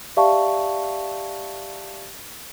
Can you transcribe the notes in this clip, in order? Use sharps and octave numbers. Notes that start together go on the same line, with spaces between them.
G4 D5 E5 F5 A5 C#6